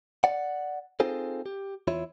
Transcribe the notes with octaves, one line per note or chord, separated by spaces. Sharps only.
D5 F#5
C4 D#4 F4 G#4 A4 C5
G4
E2 E4 F4 C#5